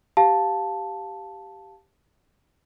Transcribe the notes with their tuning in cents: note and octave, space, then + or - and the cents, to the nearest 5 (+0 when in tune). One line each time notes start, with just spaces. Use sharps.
G4 +0 F5 +10 A5 +0